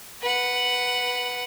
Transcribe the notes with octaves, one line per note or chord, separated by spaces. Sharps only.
B4 F#5